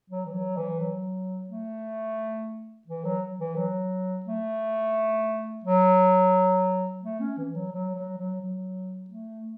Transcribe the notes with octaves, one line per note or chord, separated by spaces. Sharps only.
F#3
E3
F#3
E3
F#3
A3
E3
F#3
E3
F#3
A3
F#3
A3
C#4
E3
F#3
F#3
F#3
F#3
F#3
A3